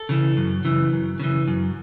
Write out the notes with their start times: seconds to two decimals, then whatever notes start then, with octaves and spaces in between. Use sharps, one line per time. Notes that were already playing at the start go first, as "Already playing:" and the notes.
Already playing: A4
0.09 C#3 E3
0.37 F#2
0.65 C#3 E3
0.92 F#2
1.20 C#3 E3
1.48 F#2